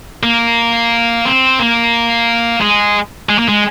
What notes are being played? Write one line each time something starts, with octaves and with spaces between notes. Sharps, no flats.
A#3
C4
A#3
G#3
G#3
A#3
G#3